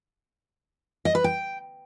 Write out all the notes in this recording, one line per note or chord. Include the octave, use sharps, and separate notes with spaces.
D#5
B4
G5